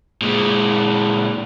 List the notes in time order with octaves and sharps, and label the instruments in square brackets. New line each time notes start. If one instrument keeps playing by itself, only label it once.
[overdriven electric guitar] A#2 G#3